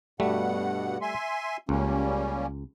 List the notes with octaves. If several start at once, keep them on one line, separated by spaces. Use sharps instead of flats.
G2 B2 G3 A3 F#5
E5 G#5 C6
C#2 G3 A#3 C#4